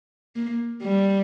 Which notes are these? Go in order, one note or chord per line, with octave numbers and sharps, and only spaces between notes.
A#3
G3